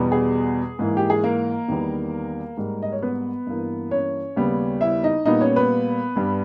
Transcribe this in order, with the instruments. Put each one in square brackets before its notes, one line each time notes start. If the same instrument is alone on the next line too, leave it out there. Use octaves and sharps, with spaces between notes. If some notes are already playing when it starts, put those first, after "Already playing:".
Already playing: [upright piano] E2 B2 G3 B3
G#4
G#2 E3 A#3
G4
G#4
A#3 A#4
E2 D#3 G3 B3
G#2 G3 A#3
D#5
C#5
B3 B4
G2 E3 A#3
C#4 C#5
D#2 C#3 G3 B3
E4 E5
D#4 D#5
A#2 G3 B3 D#4 D#5
C#4 C#5
B3 B4
G2 G3 B3